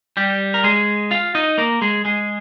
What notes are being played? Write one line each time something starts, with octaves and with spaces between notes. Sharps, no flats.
G3 G4
A#4
G#3 G#4
F4 F5
D#4 D#5
A#3 A#4
G#3 G#4
G#3 G#4